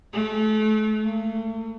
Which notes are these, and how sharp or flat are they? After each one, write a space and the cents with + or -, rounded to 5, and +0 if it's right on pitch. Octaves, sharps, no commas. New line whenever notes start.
A3 -35
A3 +40